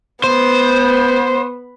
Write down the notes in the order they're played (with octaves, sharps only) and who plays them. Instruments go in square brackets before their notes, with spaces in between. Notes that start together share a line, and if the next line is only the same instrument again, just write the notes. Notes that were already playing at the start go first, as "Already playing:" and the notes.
[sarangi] B3 [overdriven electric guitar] C5